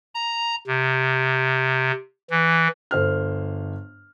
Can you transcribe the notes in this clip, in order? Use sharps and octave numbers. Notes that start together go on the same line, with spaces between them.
A#5
C3
E3
G1 C5 F6